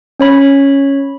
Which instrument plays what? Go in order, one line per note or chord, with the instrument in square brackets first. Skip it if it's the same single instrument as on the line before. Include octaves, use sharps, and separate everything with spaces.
[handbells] C#4 C#5 B5